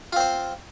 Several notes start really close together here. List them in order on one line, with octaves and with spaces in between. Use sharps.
F4 C4 C5